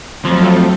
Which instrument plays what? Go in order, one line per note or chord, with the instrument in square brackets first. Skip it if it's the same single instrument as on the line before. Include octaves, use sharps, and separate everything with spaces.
[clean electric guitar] F2 F3 [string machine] F#3 A3 C4 F4 A4